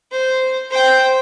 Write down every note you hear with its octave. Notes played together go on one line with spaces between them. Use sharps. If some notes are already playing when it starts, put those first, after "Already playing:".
C5
C5 G5